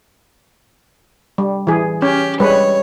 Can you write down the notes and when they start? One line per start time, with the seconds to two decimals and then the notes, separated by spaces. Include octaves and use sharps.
1.38 G3
1.67 E3 G#4
2.02 C#4 G4
2.40 G3 G#3 B4 C#5